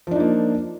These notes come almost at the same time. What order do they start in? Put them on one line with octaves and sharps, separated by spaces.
F3 D4 D#4 A#3